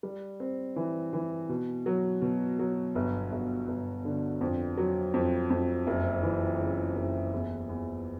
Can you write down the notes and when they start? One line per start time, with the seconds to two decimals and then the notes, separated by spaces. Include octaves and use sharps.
0.03 G3
0.40 C4
0.76 E3
1.13 E3
1.49 B2
1.86 F#3
2.22 B2
2.59 F#3
2.95 G1
3.32 G1
3.68 G1
4.05 D3
4.41 F2
4.77 F#3
5.14 F2
5.50 F2
5.87 F#1
6.23 E3
6.60 C#3
6.96 F#1
7.33 E2
7.69 E2